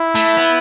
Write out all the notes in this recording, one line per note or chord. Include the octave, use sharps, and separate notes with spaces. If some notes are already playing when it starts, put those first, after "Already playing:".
Already playing: E4
A3
B3